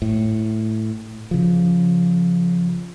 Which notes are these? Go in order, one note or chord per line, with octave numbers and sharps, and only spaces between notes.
A2
C#3 F3